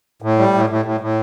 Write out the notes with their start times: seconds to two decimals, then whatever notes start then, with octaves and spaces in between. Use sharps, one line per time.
0.22 A2
0.39 G3
0.54 A2
0.70 A2
0.85 A2
1.00 A2